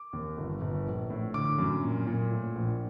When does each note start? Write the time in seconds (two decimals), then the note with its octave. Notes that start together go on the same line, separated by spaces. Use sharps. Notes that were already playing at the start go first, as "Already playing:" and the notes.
Already playing: D6
0.13 D#2
0.38 G1
0.61 G1
0.86 A#1
1.10 A2
1.34 D3 D6
1.59 F#2
1.83 A#2
2.07 A#2
2.31 A2
2.56 A#1